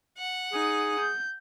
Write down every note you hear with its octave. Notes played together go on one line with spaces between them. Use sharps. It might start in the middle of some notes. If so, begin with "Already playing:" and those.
F#5
D#4 G#4
G6